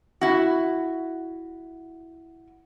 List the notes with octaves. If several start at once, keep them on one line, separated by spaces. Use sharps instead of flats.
E4 F#4